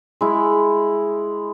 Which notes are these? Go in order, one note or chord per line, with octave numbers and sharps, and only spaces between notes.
G#3 E4